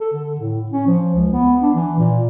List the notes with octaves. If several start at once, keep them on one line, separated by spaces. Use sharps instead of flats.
A4
D3
A2
C#4
F3
C#2
B3
D4
E3
A#2